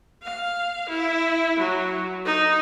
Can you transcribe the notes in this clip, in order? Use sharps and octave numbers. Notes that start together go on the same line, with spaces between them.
F5
E4
F#3
D#4